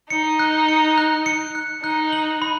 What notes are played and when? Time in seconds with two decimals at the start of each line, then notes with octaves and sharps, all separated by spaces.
0.10 D#4 C#7
0.39 F#6
0.68 C#7
0.98 F#6
1.26 C#7
1.55 F#6
1.83 D#4 F#6
2.13 F#7
2.42 B5